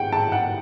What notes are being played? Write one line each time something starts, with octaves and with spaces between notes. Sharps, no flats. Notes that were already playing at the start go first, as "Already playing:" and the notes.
Already playing: F#5 G5
A5
F#5